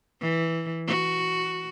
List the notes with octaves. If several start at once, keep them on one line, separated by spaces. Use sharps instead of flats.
E3
F#4